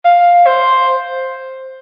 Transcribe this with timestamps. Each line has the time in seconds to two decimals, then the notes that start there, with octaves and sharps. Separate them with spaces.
0.05 F5
0.46 C5